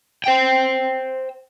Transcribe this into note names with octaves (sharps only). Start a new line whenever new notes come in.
C5 G5